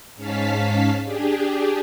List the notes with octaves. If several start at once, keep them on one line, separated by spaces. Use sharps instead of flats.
G#2 C#4 F5 A5 B6
D4 G4 G#4